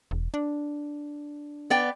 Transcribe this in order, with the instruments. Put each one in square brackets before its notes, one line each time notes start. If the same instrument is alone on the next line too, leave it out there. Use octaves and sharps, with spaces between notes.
[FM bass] E1
D4
[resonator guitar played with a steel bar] B3 D5 G5